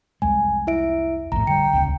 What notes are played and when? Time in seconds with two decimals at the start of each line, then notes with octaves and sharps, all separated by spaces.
0.22 C2 F2 G#3 G#5
0.67 E4 E5 D7
1.32 A#1 F2 A2 A#5
1.47 D3 G3 G5 C#7
1.73 D#1 G#1 C#2